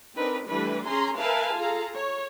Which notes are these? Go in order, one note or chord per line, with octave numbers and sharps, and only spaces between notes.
C4 D4 D#4 A#4 B4
E3 G3 A3 D4 B4
C#4 G#4 G#5 A#5 C6
A#4 B4 E5 F5 G#5 A5
F4 G#4 A4 F5 A#5
C#5